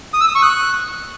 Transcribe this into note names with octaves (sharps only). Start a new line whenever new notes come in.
D#6
E6
D#6
C#6
F#6